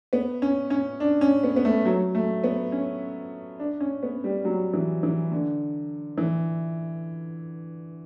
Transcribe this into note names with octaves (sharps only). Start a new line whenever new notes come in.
B3
C#4
C#4
D4
C#4
B3
B3
A3
F#3
A3
B3
C#4
D4
C#4
B3
G3
F#3
E3
E3
D3
E3